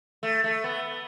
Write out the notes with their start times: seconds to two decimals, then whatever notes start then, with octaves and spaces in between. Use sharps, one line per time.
0.23 A3
0.44 A3
0.64 B3